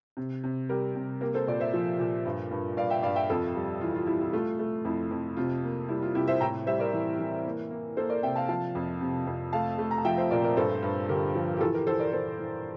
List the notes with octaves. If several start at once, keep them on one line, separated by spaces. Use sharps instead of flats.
C3
C3
G3 G4 A#4
C3
A#3 G4 A#4
A4 C5
A#2 D5
C5 E5
F3
A#2
G2
G2
G2 D5 F5
E5 G5
G2 D5 F5
E5 G5
F2 F4 A4
G3
E3 F4
F4
G3 E4
F4
A3 F4
A3
F2 E4
F2
C3 F4
A#3
G3 E4
F4
C3 E4 G4
C5 E5
A2 G5 A#5
G3 C5 E5
A#4 D5
E3
E3
A#3
A#3
A#3 A4 C5
A#4 D5
C3 E5 G5
F5 A5
F3 F5 A5
F2
C3
F2
A3 F5 A5
A3
A#5
A5
F3 E5 G5
C5 E5
A#2 A#4 D5
A#4 D5
G2 A4 C5
G2
D3 G4 A#4
F3
G4
E3 F4 A4
G4 A#4
E3 A4 C5
A#4 D5
E3 A4 C5
E3